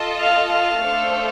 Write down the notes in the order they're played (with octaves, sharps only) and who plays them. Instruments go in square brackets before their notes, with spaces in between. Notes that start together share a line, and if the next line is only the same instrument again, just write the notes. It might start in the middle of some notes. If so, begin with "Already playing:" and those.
Already playing: [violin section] F4 A4 D#5 A5
[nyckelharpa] F5
F5
[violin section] A3 D4 A4 C5